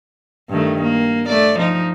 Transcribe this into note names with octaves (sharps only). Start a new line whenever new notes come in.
G2 D#3 A3
A#3
A3 D5
F3 D#4